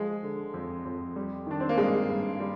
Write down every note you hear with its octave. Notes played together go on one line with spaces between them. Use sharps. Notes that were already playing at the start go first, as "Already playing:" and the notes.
Already playing: F3 G#3
D3
F2
F2
G3
D#3 D4
C4
A#3
G2 G#3
G2
G3